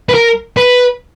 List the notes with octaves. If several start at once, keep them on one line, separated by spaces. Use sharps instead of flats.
B4
A#4
B4